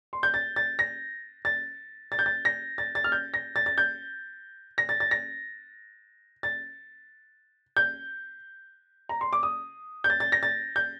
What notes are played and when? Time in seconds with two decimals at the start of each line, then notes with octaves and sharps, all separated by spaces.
0.13 C6
0.23 G6
0.34 A6
0.56 A6
0.79 A#6
1.45 A6
2.12 A6
2.19 G6
2.26 A6
2.45 A#6
2.78 A6
2.95 A6
3.04 F6
3.12 G6
3.34 A#6
3.56 A6
3.66 A6
3.78 G6
4.78 A#6
4.89 A6
5.00 A6
5.11 A#6
6.43 A6
7.77 G6
9.09 A#5
9.21 C6
9.33 D6
9.43 D#6
10.04 G6
10.10 A6
10.20 A6
10.32 A#6
10.43 A6
10.76 G6